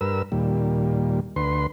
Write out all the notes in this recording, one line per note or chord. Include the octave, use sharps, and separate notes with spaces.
G2 A#4 B4 E6
D#2 A#2 G3
D2 B4 C6